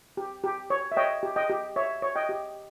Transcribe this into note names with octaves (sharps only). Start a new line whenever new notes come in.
G4
G4
C#5
E5
C#5 D#5 G5
G4
D#5 G5
G4
C#5 E5
C#5
D#5 G5
G4